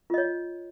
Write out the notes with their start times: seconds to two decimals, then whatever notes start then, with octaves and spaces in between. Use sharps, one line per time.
0.10 F4
0.14 D#5
0.18 C#5